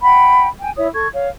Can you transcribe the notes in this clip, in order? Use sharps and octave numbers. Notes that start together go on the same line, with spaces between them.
F#5 G5 B5
G5 G#5
E4 C#5 E5 D#6
A4 C#6 G#6
C#5 F5